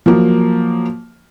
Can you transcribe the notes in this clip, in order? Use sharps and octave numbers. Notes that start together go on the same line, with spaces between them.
F3 F#3 A#3